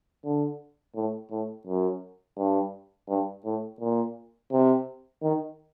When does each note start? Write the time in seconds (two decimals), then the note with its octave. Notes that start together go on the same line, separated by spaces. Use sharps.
0.25 D3
0.95 A2
1.31 A2
1.67 F#2
2.38 G2
3.09 G2
3.45 A2
3.80 A#2
4.52 C3
5.23 D#3